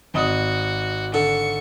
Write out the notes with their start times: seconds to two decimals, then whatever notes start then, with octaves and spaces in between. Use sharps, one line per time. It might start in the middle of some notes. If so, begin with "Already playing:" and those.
0.14 G#1 F#4 D#5 D#6
1.14 D3 C#6